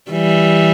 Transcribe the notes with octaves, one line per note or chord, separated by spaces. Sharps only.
E3 G3